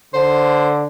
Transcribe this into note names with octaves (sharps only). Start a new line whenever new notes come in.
D3 C5